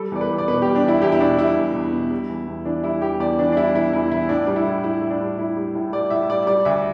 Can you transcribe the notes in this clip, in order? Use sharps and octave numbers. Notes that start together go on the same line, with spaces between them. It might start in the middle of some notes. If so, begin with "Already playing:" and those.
Already playing: G3 A4
E2 D5
B4
E2
D5
B2 B4
G3 G4
D4
E2 E4
E2 G4
E4
B2 D4
G3 E4
E2
E2
B2
G3
E2
E2
E3 D4
G3 E4
E2 G4
E2 D5
E3 D4
D4
G3 E4
E2 E4
E2 E4
E3 E4
A2 D4
G3
E4
A2
G3 E4
A2
D4
G3
A2 E4
G3
A2
G3 D5
A2 E5
G3 D5
G3 D5
D2 E5